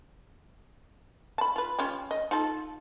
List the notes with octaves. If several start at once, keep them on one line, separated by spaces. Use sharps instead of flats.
A5 B5
F4 B4
C#4 F4 G4
D#5
D#4 F4 A4